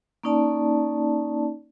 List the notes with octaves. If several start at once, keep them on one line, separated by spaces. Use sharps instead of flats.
A#3 C#4 D#4 D5 A5